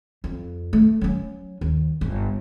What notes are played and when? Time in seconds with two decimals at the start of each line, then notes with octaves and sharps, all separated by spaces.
0.24 F2
0.73 A3
1.01 F#3 C#4
1.61 D#2
2.01 G1